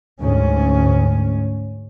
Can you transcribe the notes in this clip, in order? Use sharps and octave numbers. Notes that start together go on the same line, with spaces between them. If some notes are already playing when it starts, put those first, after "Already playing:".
D2 G#2 C#4